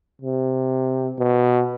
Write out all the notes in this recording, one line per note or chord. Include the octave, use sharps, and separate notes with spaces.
C3
B2